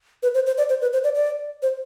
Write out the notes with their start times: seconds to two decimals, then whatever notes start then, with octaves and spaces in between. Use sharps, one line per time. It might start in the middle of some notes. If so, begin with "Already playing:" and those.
0.23 B4
0.35 C5
0.46 C5
0.58 D5
0.69 C5
0.81 B4
0.93 C5
1.04 D5
1.15 D5
1.62 C5